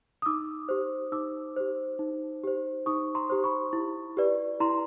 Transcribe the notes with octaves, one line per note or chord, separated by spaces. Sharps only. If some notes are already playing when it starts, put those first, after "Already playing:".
D#6
D#4 D6 E6
G4 C5
D#4 D6 E6
G4 C5
D#4
G4 C5
D#4 C#6 D#6
A#5 C6
G4 C5
B5 C#6
E4
G4 B4 D5
E4 A#5 C6